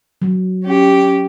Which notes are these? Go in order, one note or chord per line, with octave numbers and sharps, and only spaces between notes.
F#3
C#4 G4